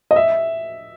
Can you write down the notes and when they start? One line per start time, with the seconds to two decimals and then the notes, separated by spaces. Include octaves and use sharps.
0.11 D#5
0.16 E5